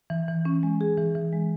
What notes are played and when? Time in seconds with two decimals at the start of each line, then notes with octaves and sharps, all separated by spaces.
0.10 E3
0.28 E3
0.45 C#4
0.63 G#3
0.81 G#4
0.98 E3
1.15 E3
1.33 G#3